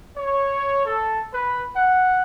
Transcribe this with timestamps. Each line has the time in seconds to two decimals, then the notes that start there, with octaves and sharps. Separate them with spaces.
0.17 C#5
0.85 A4
1.34 B4
1.76 F#5